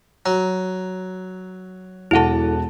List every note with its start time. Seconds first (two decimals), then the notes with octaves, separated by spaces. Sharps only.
0.26 F#3 A#5
2.11 E1 E4 A4 F#5 A5